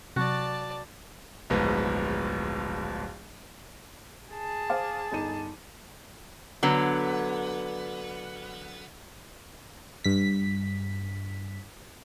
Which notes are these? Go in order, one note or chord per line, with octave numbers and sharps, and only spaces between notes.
C3 F#3 F#4 D5 A5
D1 A#1 G#2 B3
G#4 A5
C5 F5 D6
G1 D#4 D#7
D3 F#3 B3
G2 B6